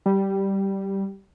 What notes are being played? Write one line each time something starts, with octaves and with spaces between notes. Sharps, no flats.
G3